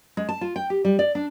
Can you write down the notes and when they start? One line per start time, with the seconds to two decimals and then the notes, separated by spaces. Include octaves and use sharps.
0.17 G#3
0.29 A5
0.41 F4
0.56 G5
0.70 G4
0.85 G3
0.99 D5
1.15 D4